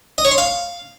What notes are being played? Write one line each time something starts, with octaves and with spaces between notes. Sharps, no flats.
D#5
C#5
C6
F5